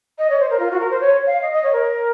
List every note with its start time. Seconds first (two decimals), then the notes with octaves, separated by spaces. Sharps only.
0.18 D#5
0.30 C#5
0.40 C5
0.50 A#4
0.59 F4
0.71 F#4
0.80 A#4
0.90 C5
1.01 C#5
1.27 F5
1.42 D#5
1.52 D#5
1.63 C#5
1.73 A#4